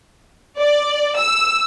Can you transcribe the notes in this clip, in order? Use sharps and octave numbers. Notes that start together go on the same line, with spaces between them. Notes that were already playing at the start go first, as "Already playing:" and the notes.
D5
E6